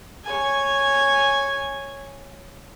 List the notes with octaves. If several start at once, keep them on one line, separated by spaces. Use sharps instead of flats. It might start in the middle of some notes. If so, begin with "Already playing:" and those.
C#5 G#5